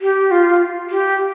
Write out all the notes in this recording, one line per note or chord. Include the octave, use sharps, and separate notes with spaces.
G4
F4
G4